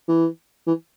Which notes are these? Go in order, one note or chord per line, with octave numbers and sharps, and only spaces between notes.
E3
E3